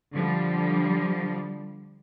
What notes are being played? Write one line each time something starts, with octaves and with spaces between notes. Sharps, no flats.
D3 F3 G3